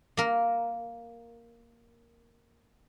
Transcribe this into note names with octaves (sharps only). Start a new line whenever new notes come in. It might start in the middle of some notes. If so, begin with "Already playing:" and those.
A#3 A#4